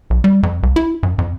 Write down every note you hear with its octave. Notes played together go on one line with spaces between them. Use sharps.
B1
G3
F2
C2
E4
F#2
F2